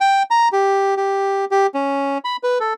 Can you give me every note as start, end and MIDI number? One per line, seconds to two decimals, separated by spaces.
0.01 0.23 79
0.31 0.48 82
0.53 0.95 67
0.97 1.45 67
1.51 1.67 67
1.74 2.18 61
2.25 2.37 83
2.43 2.58 71
2.60 2.73 69